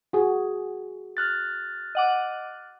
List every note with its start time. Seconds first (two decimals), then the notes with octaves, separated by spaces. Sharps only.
0.13 F#4 G#4
1.17 F6 F#6 A6
1.95 D#5 F#5 D6